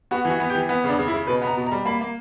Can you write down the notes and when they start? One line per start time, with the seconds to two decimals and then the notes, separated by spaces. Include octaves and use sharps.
0.11 B3 F#4
0.25 E3
0.30 F#4
0.40 B3
0.50 G4
0.55 E3
0.69 B3
0.84 C#3 D4
0.98 C#3
1.08 E4
1.13 C#3
1.27 B2 B4
1.42 B3
1.47 A#5
1.57 B2
1.67 A#5
1.71 G3
1.85 A#3 B5
2.01 A#3